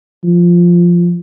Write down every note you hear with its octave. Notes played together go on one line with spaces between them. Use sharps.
F3